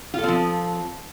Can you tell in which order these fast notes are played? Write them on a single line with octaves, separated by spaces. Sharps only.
F4 A4 C4 F3